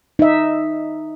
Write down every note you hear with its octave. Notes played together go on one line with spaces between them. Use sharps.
D#4 E5